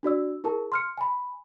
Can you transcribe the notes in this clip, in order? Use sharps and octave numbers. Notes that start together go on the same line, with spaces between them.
D4 F#4 D5 E6
E4 G#4 A#4 A5
C6 F6 C#7
G#5 B5